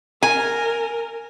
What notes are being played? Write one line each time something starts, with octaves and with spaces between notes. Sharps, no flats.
A#4 G#5